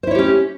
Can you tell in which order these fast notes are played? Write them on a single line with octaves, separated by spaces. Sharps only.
C5 E4 C#5 G4 C#4